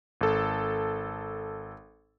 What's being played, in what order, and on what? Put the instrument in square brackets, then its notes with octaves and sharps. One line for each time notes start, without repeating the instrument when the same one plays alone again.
[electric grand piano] G#1 A4